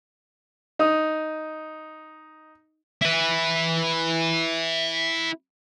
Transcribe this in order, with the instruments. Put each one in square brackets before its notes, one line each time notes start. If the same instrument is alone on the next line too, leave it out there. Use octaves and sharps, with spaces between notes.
[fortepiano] D#4 D#6
[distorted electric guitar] E4 B4